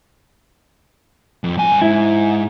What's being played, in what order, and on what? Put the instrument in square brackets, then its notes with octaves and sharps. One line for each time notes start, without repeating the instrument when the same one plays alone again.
[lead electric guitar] F2
G2 G#5
[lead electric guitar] G#2 [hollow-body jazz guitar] E4